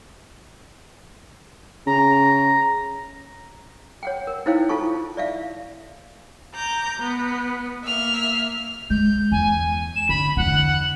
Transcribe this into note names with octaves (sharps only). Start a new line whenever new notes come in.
C#3 A#5
C#5 F#5 G5
A#4
D#4 E4 C5 C#5 F5 G5
E4 F4 A4 A5 C#6
D5 E5 F5
A#5 D6 G6
B3
A#3 E5 F6
G#3 G6
E2 G#5
E7
D3 B5
E2 D3 F#5